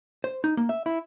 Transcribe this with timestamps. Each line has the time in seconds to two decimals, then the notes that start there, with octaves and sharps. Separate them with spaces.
0.24 C5
0.44 D#4
0.57 A#3
0.69 E5
0.86 E4